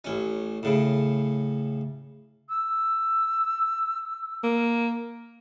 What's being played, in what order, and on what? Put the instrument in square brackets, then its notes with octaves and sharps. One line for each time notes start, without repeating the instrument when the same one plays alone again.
[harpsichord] A1 C#4
A2 C#3
[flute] E6
[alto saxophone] A#3